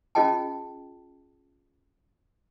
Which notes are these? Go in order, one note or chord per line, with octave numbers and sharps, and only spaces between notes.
C#4 F4 G#4 D#5 G5 A5